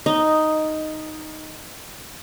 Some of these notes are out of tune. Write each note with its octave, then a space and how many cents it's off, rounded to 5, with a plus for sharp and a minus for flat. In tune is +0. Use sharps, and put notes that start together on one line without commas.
D#4 +0 D#5 -10